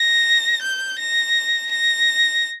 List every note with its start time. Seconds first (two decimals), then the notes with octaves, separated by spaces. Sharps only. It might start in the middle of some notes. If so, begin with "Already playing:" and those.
Already playing: A#6
0.62 G6
0.99 A#6
1.71 A#6